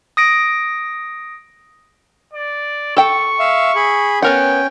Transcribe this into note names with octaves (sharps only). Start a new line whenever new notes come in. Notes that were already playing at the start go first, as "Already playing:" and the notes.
D#6 A#6 D7
D5
A4 G5 C#6
E5 F5
G#4 B5
B3 C#4 A#4 F#5 G5